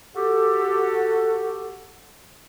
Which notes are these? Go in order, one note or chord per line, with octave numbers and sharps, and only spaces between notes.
F#4 G4 A4